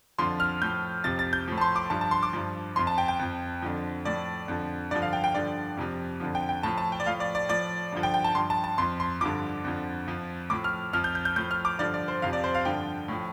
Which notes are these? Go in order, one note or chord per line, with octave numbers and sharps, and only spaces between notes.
F2 D3 F3 C6
F6
A2 F3 G6
F2 C3 F3 A6
A6
G6
A2 F3
A5
C6
D6
G2 F3 A5
A5
C6
D6
G2 F3
F2 F3 C6
A5
G5
G5
F2 F3
F2 D3 F3
A2 F3 D5
F2 D3 F3
G2 D3 F3 D5
F5
G5
G5
G2 D3 F3 D5
F2 C3 F3
F2 D3 F3
G5
G5
A2 F3 A5
A5
G5
D5
A2 F3 F5
D5
D5
A2 F3 D5
G2 D3 F3
G5
G5
A5
G2 F3 C6
A5
A5
F2 F3 C6
C6
G2 D3 F3 D6
F2 D3 F3
F2 F3
A2 F3 D6
F6
F2 F3 F6
G6
G6
G6
A2 F3 G6
F6
D6
G2 D3 F3 D5
D5
C5
F2 C3 F3 F5
D5
C5
F5
G2 D3 F3 G5
A2 F3